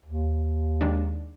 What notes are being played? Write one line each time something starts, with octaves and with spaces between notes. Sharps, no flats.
D#2
D#3 G#3 D4